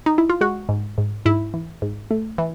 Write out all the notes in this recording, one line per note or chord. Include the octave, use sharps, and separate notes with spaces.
D#4
E4
F4
G#3 F#4
G#2
G#2
G#2 E4
E3
G#2
A3
E3